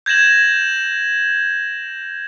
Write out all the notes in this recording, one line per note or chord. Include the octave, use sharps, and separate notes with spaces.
G6 G#6 A#6 E7 F#7